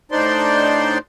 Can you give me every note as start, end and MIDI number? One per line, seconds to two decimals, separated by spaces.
0.12 0.98 45
0.12 0.98 62
0.12 0.98 63
0.12 0.98 72
0.12 0.98 74
0.12 0.98 84